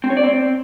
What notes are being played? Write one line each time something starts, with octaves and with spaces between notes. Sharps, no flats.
C4
C#5
D5
C4